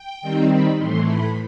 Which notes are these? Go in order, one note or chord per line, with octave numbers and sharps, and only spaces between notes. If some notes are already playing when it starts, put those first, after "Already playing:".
Already playing: G5
D#3 G3 C4 D#4
B5
A2 E3 A3 C6
B5